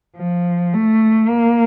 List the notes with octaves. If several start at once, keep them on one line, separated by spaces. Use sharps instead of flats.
F3
A3
A#3